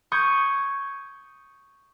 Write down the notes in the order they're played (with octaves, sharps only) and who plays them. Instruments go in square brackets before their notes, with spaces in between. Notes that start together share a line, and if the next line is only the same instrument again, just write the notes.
[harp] C#6 D#6 G6 G#6